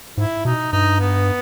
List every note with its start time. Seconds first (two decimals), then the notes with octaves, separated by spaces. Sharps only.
0.17 G#2 E4
0.45 B2 D#4
0.72 G2 D#4
1.00 B3